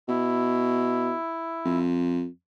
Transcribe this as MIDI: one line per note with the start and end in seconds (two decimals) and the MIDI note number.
0.09 1.13 47
0.09 1.79 64
1.65 2.26 41